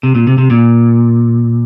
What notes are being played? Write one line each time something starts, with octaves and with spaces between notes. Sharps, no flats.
C3
A#2
C3
C3
A#2